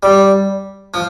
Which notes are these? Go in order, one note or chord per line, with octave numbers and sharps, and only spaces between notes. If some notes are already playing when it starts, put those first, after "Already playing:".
G3
F3